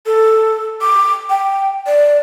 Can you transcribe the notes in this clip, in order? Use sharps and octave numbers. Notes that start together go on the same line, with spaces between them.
A4
D6
G5
D5